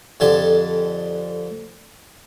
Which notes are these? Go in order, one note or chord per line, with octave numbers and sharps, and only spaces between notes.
F2 D3 G4 G#5 A5